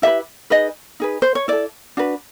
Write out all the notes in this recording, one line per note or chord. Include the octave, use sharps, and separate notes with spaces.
E4 G4 B4 E5
D#4 G#4 B4 D#5
D#4 G#4 B4
C5
C#5
E4 A4 D5
D4 F#4 B4